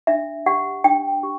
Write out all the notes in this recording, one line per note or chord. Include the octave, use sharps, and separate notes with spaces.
D4 E5
G4 F#5
D4 G5
G4